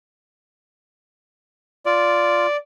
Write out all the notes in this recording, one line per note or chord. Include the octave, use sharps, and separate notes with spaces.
F4 D5